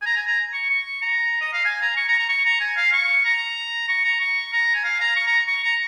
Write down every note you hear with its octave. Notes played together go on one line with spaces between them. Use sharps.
G#5
A#5
G#5
A#5
C#6
C#6
A#5
D#5
F5
G#5
A#5
C#6
A#5
A#5
C#6
A#5
G#5
F5
C#6
A#5
C#6
A#5
C#6
A#5
G#5
F5
A#5
C#6
A#5
C#6
A#5